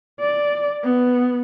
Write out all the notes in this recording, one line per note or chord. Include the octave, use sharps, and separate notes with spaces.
D5
B3